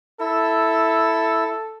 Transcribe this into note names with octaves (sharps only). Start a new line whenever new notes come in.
E4 A4